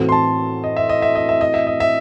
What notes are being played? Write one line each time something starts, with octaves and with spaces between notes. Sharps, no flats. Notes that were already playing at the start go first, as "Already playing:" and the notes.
Already playing: A2 E3 C4 F#4 A4
C6
A5
D#5
E5
D#5
E5
D#5
E5
D#5
E5
D#5
E5